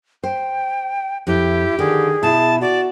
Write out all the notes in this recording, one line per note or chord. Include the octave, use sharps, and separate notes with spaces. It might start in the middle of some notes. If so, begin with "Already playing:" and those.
C5 G5
F2 E4 G4
D3 D#3 G#4
B2 E4 A5
F#4 D5